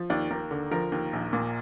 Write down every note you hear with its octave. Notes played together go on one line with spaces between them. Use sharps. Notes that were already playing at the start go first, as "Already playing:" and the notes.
Already playing: F3
D#2 D5
D#2 A#4
D3
F3 A#4
D#2
A#1
A#2